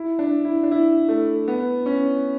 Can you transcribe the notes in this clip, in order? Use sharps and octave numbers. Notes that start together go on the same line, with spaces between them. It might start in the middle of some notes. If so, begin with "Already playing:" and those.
Already playing: E4
D4
E4
D4
E4
A3
B3
C#4